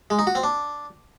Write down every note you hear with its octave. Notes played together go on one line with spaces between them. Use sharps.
G#3
D#4
F#4
C4
D4